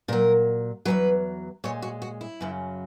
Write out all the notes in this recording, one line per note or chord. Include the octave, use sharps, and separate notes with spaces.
A#2 F#3 A#4
E2 B2 F#3 B4
A#2 G#3 C#5
F#4
F#4
E4
F#2 C#3 F#3